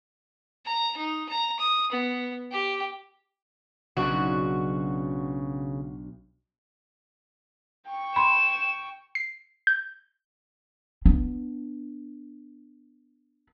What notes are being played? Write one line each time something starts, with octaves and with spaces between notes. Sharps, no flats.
A#5
D#4
A#5
D#6
B3
G4
B1 C#3 D4 F#4
G5 C#6
B5 C6 E7
C7
G6
B3 D4